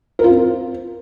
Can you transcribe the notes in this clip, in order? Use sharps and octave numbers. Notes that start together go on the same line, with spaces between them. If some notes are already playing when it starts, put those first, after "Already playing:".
A#4
F4
C4